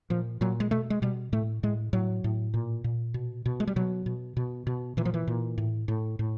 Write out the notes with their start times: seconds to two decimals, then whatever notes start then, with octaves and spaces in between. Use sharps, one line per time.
0.10 A#2 F3
0.41 A#2 F#3
0.60 G#3
0.71 B2 A3
0.90 G#3
1.02 B2 G3
1.32 A2 A3
1.63 A2 G#3
1.93 A2 F#3
2.24 A2
2.54 A#2
2.84 A#2
3.14 B2
3.46 B2
3.60 G#3
3.67 G3
3.76 B2 F#3
4.06 B2
4.37 B2
4.67 B2
4.97 A#2 E3
5.05 F3
5.14 E3
5.27 A#2
5.58 A2
5.88 A2
6.19 A2